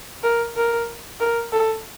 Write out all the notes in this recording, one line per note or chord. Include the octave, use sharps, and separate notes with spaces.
A#4
A#4
A#4
A4